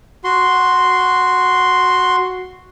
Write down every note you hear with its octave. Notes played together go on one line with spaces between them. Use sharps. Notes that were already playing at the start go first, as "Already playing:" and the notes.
F#4 C6